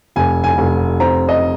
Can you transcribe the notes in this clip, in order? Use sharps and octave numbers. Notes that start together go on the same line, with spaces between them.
F1 G#5
G#5
F1
C4 A#5
D#5